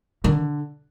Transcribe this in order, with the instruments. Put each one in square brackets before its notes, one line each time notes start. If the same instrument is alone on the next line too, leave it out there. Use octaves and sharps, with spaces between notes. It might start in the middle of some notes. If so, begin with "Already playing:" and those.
[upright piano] D3 [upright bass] D#3